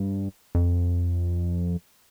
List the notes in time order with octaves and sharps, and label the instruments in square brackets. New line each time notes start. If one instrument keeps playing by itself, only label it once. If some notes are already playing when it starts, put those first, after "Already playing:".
Already playing: [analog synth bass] G2
F2